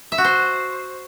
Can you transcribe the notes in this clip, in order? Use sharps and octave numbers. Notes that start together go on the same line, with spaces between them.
E5
F#4
C5